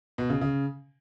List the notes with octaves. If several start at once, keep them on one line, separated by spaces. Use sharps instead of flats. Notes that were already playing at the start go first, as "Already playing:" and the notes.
B2
C#3
C#3